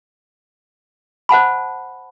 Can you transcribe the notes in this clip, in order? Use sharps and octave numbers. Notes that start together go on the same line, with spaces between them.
C5 F#5 A5 B5